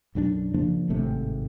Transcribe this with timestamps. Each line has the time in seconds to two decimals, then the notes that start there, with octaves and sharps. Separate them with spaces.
0.15 B1 F#2 C4 D4
0.54 C#3 F3 A#3 D4
0.89 G#1 A2 C3 A3